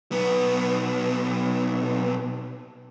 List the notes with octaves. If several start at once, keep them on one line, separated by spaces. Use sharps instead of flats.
B1 B3